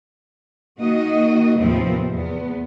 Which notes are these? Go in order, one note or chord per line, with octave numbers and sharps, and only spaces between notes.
D#3 A#3 F#4 D#5
D#2 A2 C3 F3 B3 C4
E2 B3